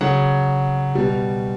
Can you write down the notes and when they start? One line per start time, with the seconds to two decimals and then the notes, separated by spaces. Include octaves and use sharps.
0.01 C#3 F#3 F#5
0.95 B2 G3